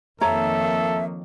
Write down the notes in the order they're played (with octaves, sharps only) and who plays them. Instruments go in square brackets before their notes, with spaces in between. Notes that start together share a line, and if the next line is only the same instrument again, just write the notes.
[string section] F2 D#3 A#3 [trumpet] A4 [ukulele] C#5 A#5 [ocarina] E5